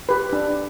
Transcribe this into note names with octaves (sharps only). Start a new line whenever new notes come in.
G4 B4
D4